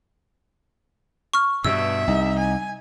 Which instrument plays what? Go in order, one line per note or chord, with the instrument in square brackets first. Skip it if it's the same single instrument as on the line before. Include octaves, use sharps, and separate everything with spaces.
[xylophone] C#6 F6
[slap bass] G2 B2 [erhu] E5 [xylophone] E6
[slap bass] C2 [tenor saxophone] D#4
[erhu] G#5